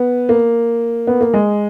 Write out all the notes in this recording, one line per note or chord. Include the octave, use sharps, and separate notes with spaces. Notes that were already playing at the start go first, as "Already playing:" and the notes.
Already playing: B3
A#3
B3
A#3
G#3